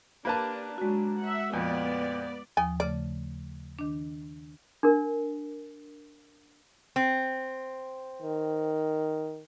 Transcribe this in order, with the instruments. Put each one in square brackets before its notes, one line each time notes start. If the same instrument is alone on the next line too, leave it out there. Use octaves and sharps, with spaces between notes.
[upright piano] A#3 B4 A5 [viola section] D4 G4
[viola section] F#3 D4 [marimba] G#3 F#4
[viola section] E5 F#5
[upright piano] F2 A#2 [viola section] B3 D5
[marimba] D#2 F3 D#6 [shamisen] G#5
[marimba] C#3 A3 [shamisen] D5
[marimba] D#3 D4
[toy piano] D4 A#4
[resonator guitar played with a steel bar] C4
[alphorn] D#3